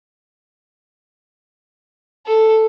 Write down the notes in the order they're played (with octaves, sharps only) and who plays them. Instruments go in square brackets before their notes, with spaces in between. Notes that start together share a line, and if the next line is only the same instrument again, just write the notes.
[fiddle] A4